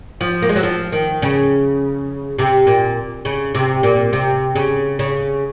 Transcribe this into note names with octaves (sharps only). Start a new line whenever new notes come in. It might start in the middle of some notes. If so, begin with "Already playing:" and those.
F3
A#3
G#3
F#3
F3
D#3
C#3
C3
A#2
C#3
C3
A#2
C3
C#3
C#3